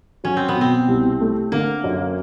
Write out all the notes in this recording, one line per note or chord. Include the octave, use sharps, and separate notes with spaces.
F#3 C#4
C4
B3
B2
C4
C2
A3
D3 A#3
F#2